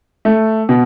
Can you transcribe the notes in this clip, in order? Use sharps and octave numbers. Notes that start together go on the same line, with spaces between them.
A3
B2